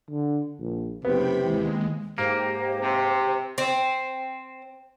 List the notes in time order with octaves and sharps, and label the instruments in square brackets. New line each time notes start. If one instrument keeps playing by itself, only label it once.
[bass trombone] D3
A#1
[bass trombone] F#1 [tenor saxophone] C3 [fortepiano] B3 [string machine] G5 B5
[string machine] D#2 G#3 [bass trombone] E3
[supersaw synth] G#2 G4 [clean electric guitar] A#3 [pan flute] C5
[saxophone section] C3
[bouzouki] C4